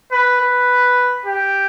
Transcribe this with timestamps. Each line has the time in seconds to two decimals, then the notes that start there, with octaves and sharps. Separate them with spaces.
0.12 B4
0.41 B4
1.26 G4